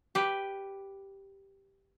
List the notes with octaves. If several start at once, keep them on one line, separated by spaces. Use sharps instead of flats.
G4 B4